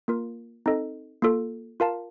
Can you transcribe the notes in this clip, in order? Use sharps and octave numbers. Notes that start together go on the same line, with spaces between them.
A#3 F4 A#4
C4 D#4 A4 D#5
A#3 F4 A4
F4 A#4 F5 A5